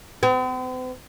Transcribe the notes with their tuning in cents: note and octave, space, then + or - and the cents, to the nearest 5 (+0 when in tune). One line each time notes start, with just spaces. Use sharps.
C4 -45